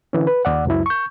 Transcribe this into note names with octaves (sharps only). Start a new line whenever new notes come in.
D3 E3 C#4
B4
D#2 D5 F#5
C#2 F#2 F#3 E4
C#6 G6